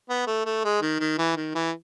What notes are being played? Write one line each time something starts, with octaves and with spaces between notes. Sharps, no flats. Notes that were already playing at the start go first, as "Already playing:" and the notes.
B3
A3
A3
G#3
D#3
D#3
E3
D#3
E3